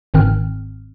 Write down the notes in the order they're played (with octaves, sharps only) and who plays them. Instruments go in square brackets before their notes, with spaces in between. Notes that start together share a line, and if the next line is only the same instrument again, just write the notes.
[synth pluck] G1 G#2 D#3 C4 F6